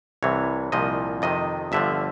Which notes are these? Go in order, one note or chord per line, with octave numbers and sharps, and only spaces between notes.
C2 C3 E3 C#5
C2 A#2 F3 D#5
F2 C3 D#3 D#5
G1 G2 D3 F3 E5